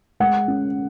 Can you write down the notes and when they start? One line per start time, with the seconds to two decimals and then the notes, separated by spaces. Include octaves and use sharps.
0.20 G#3 F#5
0.48 C#4